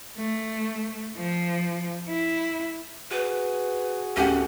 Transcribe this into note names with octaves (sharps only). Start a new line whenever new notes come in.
A3
F3
E4
F#4 G#4 B4
D1 C#4 G4 F#5